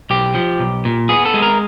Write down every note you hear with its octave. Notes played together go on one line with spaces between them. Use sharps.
B1 G4
F3
B1
A#2
B3 G#4
A4
G#3
A#4